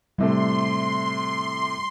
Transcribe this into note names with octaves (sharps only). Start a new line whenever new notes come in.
A2 C3 G3 A3 C6